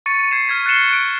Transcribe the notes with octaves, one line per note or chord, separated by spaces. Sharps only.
C#6 A6 C#7 D#7
G#6 C7 E7
F6 G#6 B6 D#7
F#6 A6 C7 C#7 E7 G7
F#6 D7